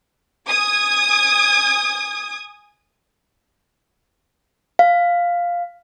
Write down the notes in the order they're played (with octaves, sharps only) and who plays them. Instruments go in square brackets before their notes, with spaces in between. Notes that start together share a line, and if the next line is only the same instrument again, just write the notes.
[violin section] G#5 D#6 G#6
[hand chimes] F5